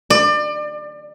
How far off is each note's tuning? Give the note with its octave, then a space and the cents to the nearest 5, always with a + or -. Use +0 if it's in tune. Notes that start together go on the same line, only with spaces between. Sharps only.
D5 +30